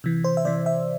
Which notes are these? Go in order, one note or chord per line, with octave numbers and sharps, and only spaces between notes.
C3 E3
C5
E5
C3 E3 D5
E5